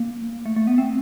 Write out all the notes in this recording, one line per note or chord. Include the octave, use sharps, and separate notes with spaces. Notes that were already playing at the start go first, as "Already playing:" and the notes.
Already playing: A#3
A3
A3
B3
C4